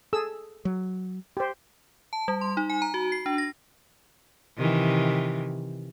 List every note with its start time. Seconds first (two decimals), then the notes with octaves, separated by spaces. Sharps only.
0.13 G#4 A4 E6
0.65 F#3
1.37 G4 C5
2.13 A5
2.28 G3
2.41 C6
2.57 D#4
2.70 G#5
2.82 A#5
2.94 F#4
3.12 C7
3.26 D4
3.38 A#6
4.57 C3 D#3 E3